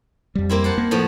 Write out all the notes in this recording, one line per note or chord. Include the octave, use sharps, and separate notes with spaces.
F2 G3
A#3 C4 E4
C5 F#5 A5
A#3
A2 F3 B3